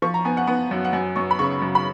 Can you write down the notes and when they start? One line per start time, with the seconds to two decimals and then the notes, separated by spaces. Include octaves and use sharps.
0.02 F3 C#6
0.14 A#5
0.25 B3 G#5
0.37 F#5
0.47 B3 F#5
0.71 F#2
0.85 F#5
0.93 F#2 G#5
1.16 F#2 C#6
1.31 B5
1.39 C#3 C#6
1.62 F#2
1.75 B5